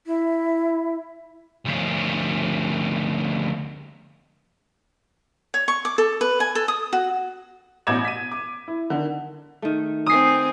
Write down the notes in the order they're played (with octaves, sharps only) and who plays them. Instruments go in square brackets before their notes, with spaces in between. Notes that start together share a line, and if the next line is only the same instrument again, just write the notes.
[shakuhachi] E4
[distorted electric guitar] D2 F3
[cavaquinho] C#5
C#6
D6
A4
B4
G#5
A4
D#6
F#4
[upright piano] A1 B2 D6 G#6 E7
B6 D#7
D6
E4
D3 D#3
[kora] D#3 A3
[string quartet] C4 G#5 [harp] D#6 C7